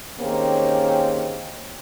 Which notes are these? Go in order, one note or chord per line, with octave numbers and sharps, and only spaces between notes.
D#3 A#3 C4 C#4 G4 G#4